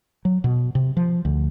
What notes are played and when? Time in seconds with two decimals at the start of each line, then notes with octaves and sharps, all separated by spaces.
0.25 F#3
0.44 B2
0.75 C3
0.97 F3
1.25 D2